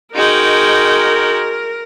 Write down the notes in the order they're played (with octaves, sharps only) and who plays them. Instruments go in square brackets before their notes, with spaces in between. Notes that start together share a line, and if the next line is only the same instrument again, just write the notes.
[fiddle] G#3 F#4 [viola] D#4 G5 [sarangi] A#4